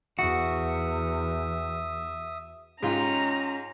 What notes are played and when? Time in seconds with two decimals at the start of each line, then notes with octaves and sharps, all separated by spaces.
0.19 E2 F#4 E5 D#6
2.83 G#2 C#4 D#4 F4 G4 A#5